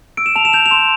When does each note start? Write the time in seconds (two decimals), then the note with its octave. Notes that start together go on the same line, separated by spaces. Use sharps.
0.17 E6 D7
0.26 E7
0.36 A5 F7
0.45 E7
0.53 G6 F7
0.66 F7
0.71 C6 E7